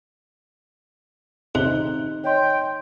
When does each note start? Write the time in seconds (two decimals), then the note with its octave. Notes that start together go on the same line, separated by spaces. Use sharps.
1.55 C3 D#4 F#6 G7
2.24 C#5 D#5 G5 C6